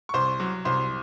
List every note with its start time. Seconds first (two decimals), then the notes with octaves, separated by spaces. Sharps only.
0.09 C#6
0.14 C2 C5 C6
0.40 F#3
0.65 C2 C5 C6